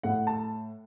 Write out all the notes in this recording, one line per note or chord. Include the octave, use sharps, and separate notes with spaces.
A2 F#5
A5